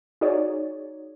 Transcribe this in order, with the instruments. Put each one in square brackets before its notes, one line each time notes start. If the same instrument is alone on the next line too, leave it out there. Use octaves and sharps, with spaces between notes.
[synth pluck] D#4 F#4 G#4 C#5 D5